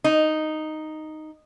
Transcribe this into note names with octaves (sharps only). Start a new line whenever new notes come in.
D#4